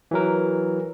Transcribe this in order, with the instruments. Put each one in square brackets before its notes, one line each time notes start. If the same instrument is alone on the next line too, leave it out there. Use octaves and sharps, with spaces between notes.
[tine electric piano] E3 F#3 A#4